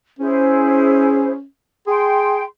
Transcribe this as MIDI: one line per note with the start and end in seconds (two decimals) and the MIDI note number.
0.19 1.45 61
0.19 1.31 64
0.19 1.31 68
0.19 1.31 72
1.87 2.44 68
1.87 2.42 79
1.87 2.42 84